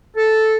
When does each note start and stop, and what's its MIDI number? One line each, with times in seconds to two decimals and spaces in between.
0.17 0.58 69